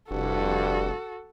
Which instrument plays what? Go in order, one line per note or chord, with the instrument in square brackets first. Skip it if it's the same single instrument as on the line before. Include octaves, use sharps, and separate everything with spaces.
[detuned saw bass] F1 [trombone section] C2 G2 [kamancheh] F#4 A4